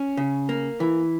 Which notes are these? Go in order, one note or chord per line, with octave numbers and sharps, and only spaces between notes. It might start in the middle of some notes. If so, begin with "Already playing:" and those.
Already playing: C#4
C#3
A#3
E3